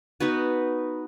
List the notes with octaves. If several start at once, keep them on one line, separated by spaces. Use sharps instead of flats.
B3 D#4 F#4 B4